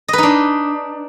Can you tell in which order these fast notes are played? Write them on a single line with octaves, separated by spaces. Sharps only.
D#5 B4 D#4 D4